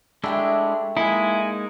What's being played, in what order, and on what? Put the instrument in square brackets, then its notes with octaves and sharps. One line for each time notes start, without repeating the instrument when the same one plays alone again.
[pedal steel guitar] G#3 D4 E4 [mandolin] A3 F#4 G4
[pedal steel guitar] G#3 A#3 D#4 [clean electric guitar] E4 [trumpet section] G#5